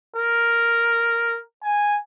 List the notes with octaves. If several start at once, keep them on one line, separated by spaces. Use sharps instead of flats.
A#4
G#5